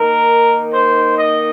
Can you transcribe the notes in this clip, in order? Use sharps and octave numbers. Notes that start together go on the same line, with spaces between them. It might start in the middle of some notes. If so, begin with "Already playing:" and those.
Already playing: D#3 A#3 D#4 A#4
C5
D#5